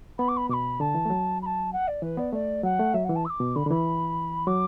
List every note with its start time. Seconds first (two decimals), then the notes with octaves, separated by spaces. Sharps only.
0.18 B3 B5
0.28 D6
0.36 B5
0.49 B2 D6
0.53 B5
0.80 D3 A5
0.95 E3
1.05 A3
1.10 F#3
1.42 B5
1.46 A5
1.72 F#5
1.87 D5
2.02 E3 B4
2.17 B3 D5
2.33 A3 D5
2.63 F#3 F#5
2.79 A3
2.94 F#3 E5
3.04 F#5
3.09 E3
3.15 A5
3.25 E6
3.29 D6
3.40 B2
3.55 D3 B5
3.66 D3
3.70 E3 B5
4.47 F#3 D6